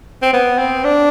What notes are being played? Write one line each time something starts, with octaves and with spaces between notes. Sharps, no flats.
C4
B3
C4
D4